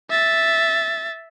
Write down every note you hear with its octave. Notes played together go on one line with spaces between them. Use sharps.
E5 A6